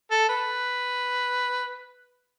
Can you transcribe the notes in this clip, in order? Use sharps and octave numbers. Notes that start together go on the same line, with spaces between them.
A4
B4